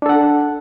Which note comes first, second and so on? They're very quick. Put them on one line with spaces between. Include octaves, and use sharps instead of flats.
D4 A4 F#5